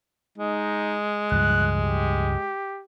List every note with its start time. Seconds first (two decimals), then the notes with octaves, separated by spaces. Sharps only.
0.38 G#3 D#4
1.31 C#2 G2 F3 F#6
1.78 G4